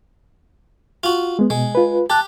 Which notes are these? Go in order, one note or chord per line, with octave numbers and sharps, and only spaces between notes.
F4 F#4
G#3 B3
B2 G#3
F4 B4
G4 A5 F#6